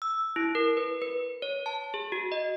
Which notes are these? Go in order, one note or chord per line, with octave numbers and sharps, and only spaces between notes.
E6
E4
A#4
B4
B4
C#5
A5
G#4
F#4
D#5